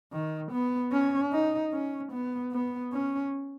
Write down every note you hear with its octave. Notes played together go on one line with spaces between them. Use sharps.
D#3
B3
C#4
D#4
C#4
B3
B3
C#4